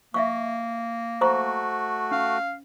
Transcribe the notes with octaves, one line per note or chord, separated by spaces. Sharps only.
A#3 E5 F5 C#6
A3 F#4 C5 A#5 C#6
C#4 F5